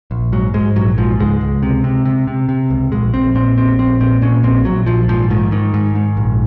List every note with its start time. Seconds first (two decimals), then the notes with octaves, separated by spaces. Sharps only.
0.11 A#1
0.32 G#2 F#3
0.54 G#2 G#3
0.76 A#1 F#3
0.98 G#2 F3
1.20 C#2 G#3
1.41 C#2
1.63 C3
1.84 C3
2.05 C3
2.27 C3
2.49 C3
2.70 C#2
2.92 A#1 G#3
3.14 A#1 C4
3.35 A#2 C4
3.57 A#1 C4
3.79 A#1 C4
4.00 A#2 C4
4.22 A#2 C#4
4.43 A#1 C4
4.65 A#1 F#3
4.86 A#1 F3
5.08 G#2 F3
5.30 G#2 D#3
5.51 G#2 D#3
5.74 G#2
5.95 G#2
6.17 A#1